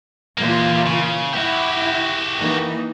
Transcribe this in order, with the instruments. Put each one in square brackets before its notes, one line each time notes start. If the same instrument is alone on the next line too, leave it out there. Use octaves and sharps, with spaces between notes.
[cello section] A#2 E3 F4 [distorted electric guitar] A#3 G4
[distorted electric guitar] C#3
[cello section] E4 [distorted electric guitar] F#4 G4
[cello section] E3 A#3 D#4